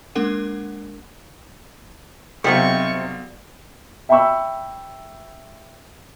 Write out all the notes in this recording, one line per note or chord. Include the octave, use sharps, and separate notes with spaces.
G#3 A#3 D4 A#4 F#5 D#7
B1 C3 G3 B3 C4 F4 C#6
E5 G5 A5 B5 C#6 E6